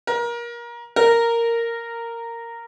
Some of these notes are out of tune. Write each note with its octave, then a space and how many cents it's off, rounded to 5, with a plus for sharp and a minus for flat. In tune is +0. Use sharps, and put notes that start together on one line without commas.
A#4 +25
A#4 -10